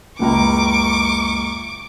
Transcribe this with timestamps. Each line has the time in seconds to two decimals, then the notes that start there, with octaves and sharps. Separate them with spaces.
0.19 F#1 C#2 A#5 C#6 D6